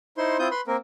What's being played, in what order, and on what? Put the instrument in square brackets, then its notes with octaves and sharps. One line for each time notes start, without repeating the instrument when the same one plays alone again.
[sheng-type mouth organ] D#4 E4 C5 C6
C4 E4 F4 D#6 G6
B4 B5 C6
A#3 C4 A#4